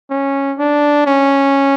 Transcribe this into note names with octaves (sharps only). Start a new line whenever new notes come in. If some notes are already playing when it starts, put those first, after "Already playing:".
C#4
D4
C#4